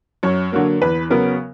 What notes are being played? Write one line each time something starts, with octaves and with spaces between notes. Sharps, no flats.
F#2 C#5
D3 F#3 A#3
E2 B4
C#3 F#3 B3 A#4